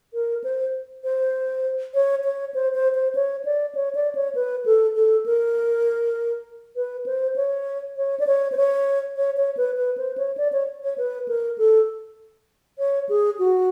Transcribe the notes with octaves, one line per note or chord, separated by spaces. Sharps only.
A#4
C5
C5
C#5
C#5
C5
C5
C5
C#5
D5
C#5
D5
C#5
B4
A4
A4
A#4
B4
C5
C#5
C#5
D5
C#5
C5
C#5
C#5
C#5
B4
B4
C5
C#5
D5
C#5
C#5
B4
A#4
A4
C#5
G#4
F#4